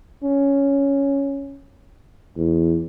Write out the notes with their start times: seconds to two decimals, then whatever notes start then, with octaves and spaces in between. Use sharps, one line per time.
0.24 C#4
2.37 E2